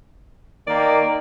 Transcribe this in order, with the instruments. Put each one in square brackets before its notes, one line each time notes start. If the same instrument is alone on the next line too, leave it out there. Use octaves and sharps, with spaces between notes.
[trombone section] D#3 A#3 [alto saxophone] D5